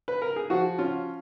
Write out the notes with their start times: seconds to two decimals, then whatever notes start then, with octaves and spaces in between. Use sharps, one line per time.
0.08 B4
0.22 A#4
0.36 G#4
0.50 F3 F#4
0.78 C#4 F4